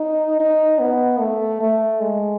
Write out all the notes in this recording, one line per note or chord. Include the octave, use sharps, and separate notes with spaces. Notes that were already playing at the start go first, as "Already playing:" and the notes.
Already playing: D#4
D#4
B3
A3
A3
G#3